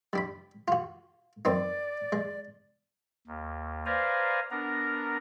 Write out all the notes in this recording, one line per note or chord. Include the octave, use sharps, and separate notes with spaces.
G3 D4 B5
F4 F#4
F#2 C4 D#4 D5
G#3
D#2
B4 C5 D5 F5 G#5 A#5
B3 D4 A#4 A#5